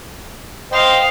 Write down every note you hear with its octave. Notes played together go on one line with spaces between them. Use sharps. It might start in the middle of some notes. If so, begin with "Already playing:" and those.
C5 D#5 F5 G5